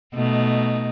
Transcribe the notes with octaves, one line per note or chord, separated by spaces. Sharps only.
B2 A3 D#4